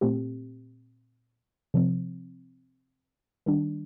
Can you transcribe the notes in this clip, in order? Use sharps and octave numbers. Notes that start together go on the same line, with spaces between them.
A#2 A3 C4 G4
C3 F3 C4
D#3 G3 D4